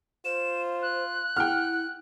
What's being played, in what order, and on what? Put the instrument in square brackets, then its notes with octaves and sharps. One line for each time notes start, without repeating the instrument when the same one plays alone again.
[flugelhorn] F4 [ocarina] C5 [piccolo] E7
[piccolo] F#6
[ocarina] E4 [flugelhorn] F#5 [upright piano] G5 F6